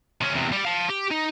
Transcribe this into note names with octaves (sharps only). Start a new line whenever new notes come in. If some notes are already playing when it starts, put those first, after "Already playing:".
C3 C#4
E2 C3
G3 D5
F5 A5
G4
D#4